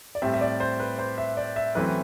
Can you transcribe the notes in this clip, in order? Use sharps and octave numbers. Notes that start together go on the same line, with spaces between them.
D5
A2 G3 C4 E5
E5
D5
C5
B4
C5
E5
D5
E5
F#2 E3 A3 C4 B4